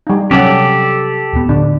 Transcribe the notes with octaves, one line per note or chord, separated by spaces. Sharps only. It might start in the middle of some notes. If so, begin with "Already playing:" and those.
G3 D#4
C3 F#3 C#4 G4 A4 C#5 D5 F#5
D#1 B3
A2 D3 D4